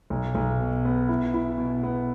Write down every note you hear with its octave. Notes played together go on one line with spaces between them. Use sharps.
B1
B1
B2
B3
E4
E4
B2
B3